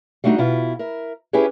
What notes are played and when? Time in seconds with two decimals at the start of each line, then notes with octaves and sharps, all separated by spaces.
0.24 G3 A3 D4 D#4 F#4
0.38 B2 E4 F4
0.79 A#4 E5
1.33 C#4 E4 G4 G#4 B4 C#5